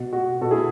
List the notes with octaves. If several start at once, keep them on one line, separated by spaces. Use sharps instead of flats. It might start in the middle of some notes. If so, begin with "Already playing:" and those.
Already playing: B2 F#4
F#4
B2 F#4 A4
E4 G#4